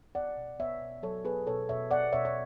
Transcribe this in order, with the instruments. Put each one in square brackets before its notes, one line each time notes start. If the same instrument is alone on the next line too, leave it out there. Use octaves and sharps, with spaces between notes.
[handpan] B3 D5 F#5
B2
B3 C#5 E5
B2
F#3 A4 C#5
B3 G#4 B4
B2 A4 C#5
B2 C#5 E5
B3 D5 F#5
B2 C#5 E5
C#5